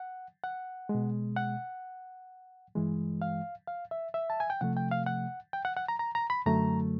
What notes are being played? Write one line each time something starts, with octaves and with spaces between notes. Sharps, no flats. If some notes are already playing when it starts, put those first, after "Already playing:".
Already playing: F#5
F#5
G#3
B2
F#5
G2 E3 G#3
F5
F5
E5
E5
A5
G#5
G5
C3 F3 A3 F#5
G5
F5
F#5
G5
F#5
F#5
A#5
A#5
A#5
B5
F#2 D3 F#3 A3 A#5